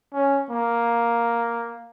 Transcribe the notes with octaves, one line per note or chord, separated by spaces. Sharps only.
C#4
A#3